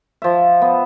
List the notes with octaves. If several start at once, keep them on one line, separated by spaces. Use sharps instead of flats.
F3 E5
B3